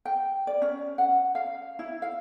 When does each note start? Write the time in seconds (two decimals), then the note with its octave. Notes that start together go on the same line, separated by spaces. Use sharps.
0.05 G5
0.47 D5
0.62 C#4
0.98 F#5
1.35 F5
1.79 E4
2.02 F5